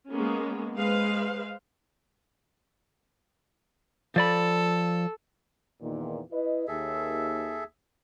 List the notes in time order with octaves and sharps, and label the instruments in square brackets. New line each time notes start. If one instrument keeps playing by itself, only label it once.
[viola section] G#3 A#3 B3 C#4
G#3 B4 C5 F5
[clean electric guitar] F3 D5 B5 [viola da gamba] A4
[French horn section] E2 A#2 D#3
E4 B4 D#5
[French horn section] D#2 [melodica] G#4 A4 E5